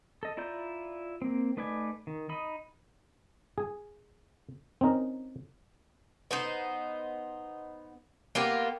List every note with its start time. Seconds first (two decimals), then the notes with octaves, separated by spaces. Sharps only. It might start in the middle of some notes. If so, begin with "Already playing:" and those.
0.23 A4 D#5
0.37 E4 F4 D5 A#5 G6
1.22 A#3 C4
1.57 A3 D#4 B4 D5 G#5
2.07 D#3
2.29 D#4 D#5 B5
3.58 G#4 G#5
4.81 C4 C#4 D#4 A#4
6.31 B3 D#4 C5
8.35 A#3 B3 F4 G4